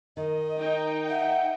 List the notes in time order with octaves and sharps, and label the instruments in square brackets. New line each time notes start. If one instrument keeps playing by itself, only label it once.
[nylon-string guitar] D#3 [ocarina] D#5
[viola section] D#4 G5
[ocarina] E5 [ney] F#5